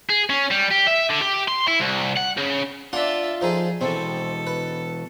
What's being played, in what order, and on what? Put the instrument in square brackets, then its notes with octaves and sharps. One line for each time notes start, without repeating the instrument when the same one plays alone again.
[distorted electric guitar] G#4
C#4
G3
G4
E5
D3
G4
C6
E4
C2
F#5
C#3
[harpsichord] D4 F#5 [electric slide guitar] F4 [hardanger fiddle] D5 E5
[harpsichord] F3 D#4 A4 [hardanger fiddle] G#4
[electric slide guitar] B2 E3 [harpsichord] C4 [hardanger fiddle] A4
[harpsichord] B4